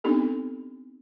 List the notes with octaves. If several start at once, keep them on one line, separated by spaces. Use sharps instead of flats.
B3 C4 D4 D#4 G4 A4